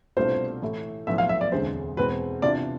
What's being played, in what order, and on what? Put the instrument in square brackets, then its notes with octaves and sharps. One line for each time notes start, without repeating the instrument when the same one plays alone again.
[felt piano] C2 B2 A3 D4 F4 [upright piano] C5
[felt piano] A2 E3 A3 E4 A4
[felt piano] B1 A2 F3 B3 [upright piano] E5
[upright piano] F5
E5
D5
[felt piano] E1 D2 D3 G#3 C4 [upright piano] C5
[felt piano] E2 B2 G#3 C4 [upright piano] B4
[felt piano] C3 E3 B3 D4 F4 [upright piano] D5